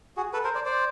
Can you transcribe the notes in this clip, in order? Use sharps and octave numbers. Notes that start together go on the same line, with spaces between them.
F#4 G#4
A4 B4
A#4 C5
C5 D5
C5 D5